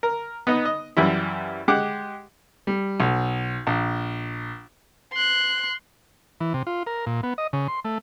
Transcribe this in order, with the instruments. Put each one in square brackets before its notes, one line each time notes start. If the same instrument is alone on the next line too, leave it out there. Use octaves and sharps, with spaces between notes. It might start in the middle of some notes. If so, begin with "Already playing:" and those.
[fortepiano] A#4
B3 D#4 D#5
D#5
F#2 E3 G3 E4
G#3 G4 F#5 D6
G3
B1
A#1
[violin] C6 F#6
[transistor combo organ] E3
C3
F4
A#4
A#2
B3
D#5
C#3
C6
A3